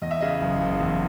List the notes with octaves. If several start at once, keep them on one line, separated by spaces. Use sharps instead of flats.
E2 D#5
E5
C#3 D#5
F#1
F#1
E2